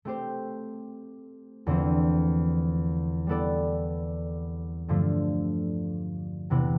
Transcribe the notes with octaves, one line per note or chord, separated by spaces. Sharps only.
A3 C4 G4 C5
E2 D3 F3 C4
G3 B3 E4 A4 D5
G2 D3 F3 A3
E2 C3 E3 B3 E4